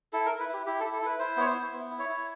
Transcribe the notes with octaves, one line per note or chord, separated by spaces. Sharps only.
E4 A4
E4 A#4
B4
E4 G4
E4 G4
A4
E4
A4
E4 B4
E4 C5
B3 C#5
C5
E4
B3
E4
C#5
E4